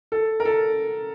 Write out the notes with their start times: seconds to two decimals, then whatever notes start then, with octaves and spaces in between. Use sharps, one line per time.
0.12 A4
0.40 A#4
0.45 A4